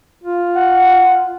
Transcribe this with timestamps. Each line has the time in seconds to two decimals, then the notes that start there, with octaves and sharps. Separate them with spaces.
0.24 F4
0.56 F#5